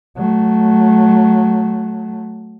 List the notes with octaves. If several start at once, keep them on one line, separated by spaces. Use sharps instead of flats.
F#3 A3